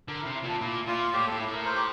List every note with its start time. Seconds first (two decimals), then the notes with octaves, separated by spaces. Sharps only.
0.08 D3 A#4
0.22 C3 E4
0.35 E4
0.43 A#2 D4
0.60 A#2 E4
0.87 A#2 F4
1.13 A2 G4
1.27 A2 A4
1.40 E4
1.48 A2 A#4
1.65 C5
1.76 G4